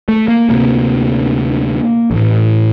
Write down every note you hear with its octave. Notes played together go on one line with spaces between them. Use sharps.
A3
A#3
D2 C3 A#3
A1 A2